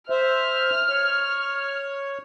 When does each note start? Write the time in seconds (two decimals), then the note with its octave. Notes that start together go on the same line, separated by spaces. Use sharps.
0.10 C5 E5 F6
0.90 C#5